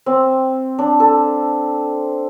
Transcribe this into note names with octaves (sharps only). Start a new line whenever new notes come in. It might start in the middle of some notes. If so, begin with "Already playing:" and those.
C4
D4
A4